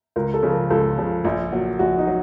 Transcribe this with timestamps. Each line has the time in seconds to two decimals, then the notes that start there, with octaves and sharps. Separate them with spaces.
0.16 C#2 A#4
0.34 A4
0.43 C#3 F3
0.52 A#4
0.70 C#2 A4
0.98 C#3 F3
1.25 A#1
1.52 A#2 F#3
1.79 A#1 F#4
1.98 D#4
2.07 F#3